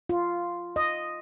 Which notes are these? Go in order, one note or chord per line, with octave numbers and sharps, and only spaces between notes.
F4
D#5